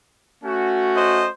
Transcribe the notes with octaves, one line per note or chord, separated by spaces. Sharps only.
A3 C#4 F#4
C5 D#5